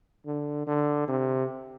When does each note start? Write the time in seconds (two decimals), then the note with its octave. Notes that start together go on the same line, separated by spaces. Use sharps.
0.26 D3
0.67 D3
1.08 C3